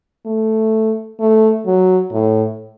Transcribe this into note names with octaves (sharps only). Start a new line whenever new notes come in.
A3
A3
F#3
A2